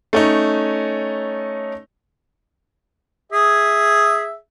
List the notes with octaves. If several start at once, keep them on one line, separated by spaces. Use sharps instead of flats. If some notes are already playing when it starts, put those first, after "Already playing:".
A3 C#4 D#4
G#4 E5